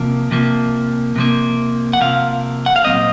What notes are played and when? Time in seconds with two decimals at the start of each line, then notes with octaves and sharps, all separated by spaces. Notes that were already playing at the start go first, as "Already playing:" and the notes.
Already playing: C3 F3 A#3
0.31 C3 F3 A#3
1.16 C3 F3 A#3
1.93 F#5
2.00 C3 F3 A#3 F5
2.66 F#5
2.76 F5
2.85 A#2 F#3 A3 C4 D#5